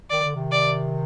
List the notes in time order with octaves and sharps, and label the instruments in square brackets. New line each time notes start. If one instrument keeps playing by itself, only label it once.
[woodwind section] D#3 [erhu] D5
[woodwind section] D3
C3 D#3
[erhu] D5